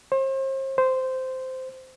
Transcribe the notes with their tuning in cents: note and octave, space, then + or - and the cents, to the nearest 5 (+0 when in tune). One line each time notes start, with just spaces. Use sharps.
C5 +40
C5 -10